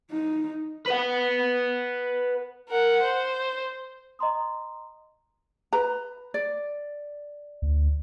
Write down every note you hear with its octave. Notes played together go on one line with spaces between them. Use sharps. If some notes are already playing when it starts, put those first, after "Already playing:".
D#4
B4 F#5
A#4 F#5
C5
D#5 A#5 C6 D#6
B4 A#5
D5
D2